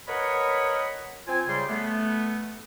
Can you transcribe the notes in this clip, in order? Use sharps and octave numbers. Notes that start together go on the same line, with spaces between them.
A#4 B4 C#5 D#5 F#5 B5
C4 F4 C5 G#5
C#3 G3 C6
A3 B3